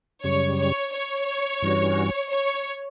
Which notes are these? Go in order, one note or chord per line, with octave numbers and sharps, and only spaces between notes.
F#2 C#3 G3 C#5
C#5
C#5
G2 E3 G3 C#4 F#4
C#5